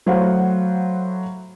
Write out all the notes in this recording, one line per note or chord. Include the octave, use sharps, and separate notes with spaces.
F#3 A3 E4 C5 F5 F#5